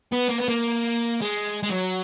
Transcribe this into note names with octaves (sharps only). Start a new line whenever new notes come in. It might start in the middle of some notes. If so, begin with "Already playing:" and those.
B3
A#3
B3
A#3
G#3
G#3
F#3